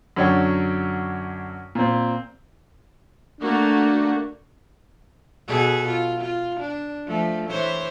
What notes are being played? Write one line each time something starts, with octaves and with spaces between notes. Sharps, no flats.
F#2 D3 F#3 C#5 D5 G5
A#2 C4
A3 A#3 D4 F#4
B2 G#4 A4
F4
F4
D4
F3 A3
E3 C5 C#5